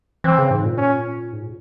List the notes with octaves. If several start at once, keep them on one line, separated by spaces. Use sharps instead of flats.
E3 C4
C#3
G#2
A#2
C#4
G#2
A#2